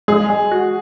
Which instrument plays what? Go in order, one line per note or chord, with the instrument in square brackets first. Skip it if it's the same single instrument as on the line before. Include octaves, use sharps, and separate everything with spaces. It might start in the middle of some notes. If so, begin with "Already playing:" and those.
[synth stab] G#3 [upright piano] G#4
[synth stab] G#3
F#4